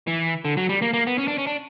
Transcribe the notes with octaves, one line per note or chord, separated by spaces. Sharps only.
E3
D3
F#3
G3
A#3
A#3
B3
C#4
D4
C#4
D4